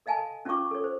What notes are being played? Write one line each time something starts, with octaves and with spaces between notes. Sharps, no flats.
A4 D#5 F5 G#5 A5 B5
C#4 F4 D5 F5 C#6 D6
A4 C#5
C5